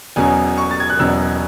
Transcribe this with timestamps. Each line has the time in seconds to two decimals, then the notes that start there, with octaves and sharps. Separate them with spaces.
0.16 E1 E2 B2 F#3 C#4 G#5
0.58 C#6
0.71 A6
0.80 G#6
0.90 F#6
0.99 E1 E2 B2 F#3 C#4 E6